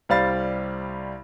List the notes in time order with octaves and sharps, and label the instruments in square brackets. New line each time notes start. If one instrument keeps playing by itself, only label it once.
[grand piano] C2 G3 C5 F5 B5 A6